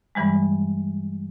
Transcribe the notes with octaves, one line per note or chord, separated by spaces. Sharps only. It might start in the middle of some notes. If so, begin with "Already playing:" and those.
G2 E3 G3 G#3